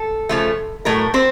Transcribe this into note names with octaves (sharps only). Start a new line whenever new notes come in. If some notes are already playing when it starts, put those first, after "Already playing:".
Already playing: A4
C#3 F3 A3
A2 F#3 A3 A#4
C4 C5